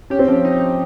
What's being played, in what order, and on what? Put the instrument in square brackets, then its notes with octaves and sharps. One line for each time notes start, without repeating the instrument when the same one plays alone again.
[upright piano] C#4 [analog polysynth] G4
[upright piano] C4
[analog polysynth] F3 [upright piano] C#4
[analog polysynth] D#4
D#4